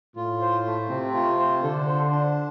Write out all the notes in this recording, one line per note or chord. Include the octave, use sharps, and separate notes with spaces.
A2 F4
C5
A3
C3 C4
F4
C5
D3 A4
C5
D4